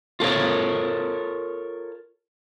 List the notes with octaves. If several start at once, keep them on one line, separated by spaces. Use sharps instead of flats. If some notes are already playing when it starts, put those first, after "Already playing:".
F4 A4 A#4 C#5